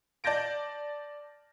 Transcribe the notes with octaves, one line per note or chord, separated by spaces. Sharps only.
D5 A5 G6 A#6 D7